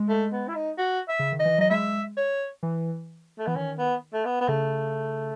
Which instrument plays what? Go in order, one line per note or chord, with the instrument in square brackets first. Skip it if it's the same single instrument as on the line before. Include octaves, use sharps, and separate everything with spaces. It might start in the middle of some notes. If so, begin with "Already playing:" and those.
Already playing: [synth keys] G#3
[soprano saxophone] A3
B3
E4
D#4
F#4
E5
[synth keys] C#3
D#3
[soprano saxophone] D#5
[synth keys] E3
[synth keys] F#3 [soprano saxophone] D#5
[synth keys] G#3 [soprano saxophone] E5
[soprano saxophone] C#5
[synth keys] E3
[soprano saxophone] A3
[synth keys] E3 [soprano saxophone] B3
[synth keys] D#3 [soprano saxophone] C#4
[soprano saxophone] B3
A3
B3
B3
[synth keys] C#3 [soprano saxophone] A3